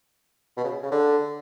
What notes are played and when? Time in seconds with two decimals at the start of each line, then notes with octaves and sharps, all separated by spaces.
0.57 B2
0.64 C#3
0.83 C#3
0.92 D3